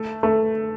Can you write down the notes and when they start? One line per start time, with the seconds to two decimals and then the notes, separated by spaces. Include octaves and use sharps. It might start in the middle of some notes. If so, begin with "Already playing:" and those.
Already playing: A3
0.23 A3